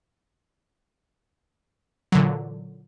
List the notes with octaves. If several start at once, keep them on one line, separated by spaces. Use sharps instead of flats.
A#2 D3 E3 F#3